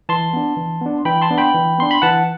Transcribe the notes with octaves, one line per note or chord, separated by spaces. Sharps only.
E3 A5 C6
B3 D4
E3
B3 D4
E3 G5 B5
A5 C6
B3 D4
G5 B5
E3
B3 D4 C6
B5
E3 F#5 A5